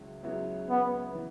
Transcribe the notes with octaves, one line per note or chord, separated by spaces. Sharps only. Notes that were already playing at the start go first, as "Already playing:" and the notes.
Already playing: C#2 C#3 F#3 E4
C#2 C#3 F#3 B3 E4
B3
E3